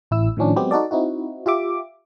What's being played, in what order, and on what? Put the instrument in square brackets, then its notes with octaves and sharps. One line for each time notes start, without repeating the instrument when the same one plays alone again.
[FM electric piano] A1 E4 E6
A2 D#3 F3 C#4 D4
F#3 G#3 B3 C4 G4
D#4 F#4 A4 D5
C4 D#4 E4 F#4
F4 G4 E5 D6